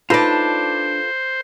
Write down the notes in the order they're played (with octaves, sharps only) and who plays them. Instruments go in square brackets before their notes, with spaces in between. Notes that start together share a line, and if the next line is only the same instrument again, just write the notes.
[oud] D4 D#4 [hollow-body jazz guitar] F4 A4 B4 [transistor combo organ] C5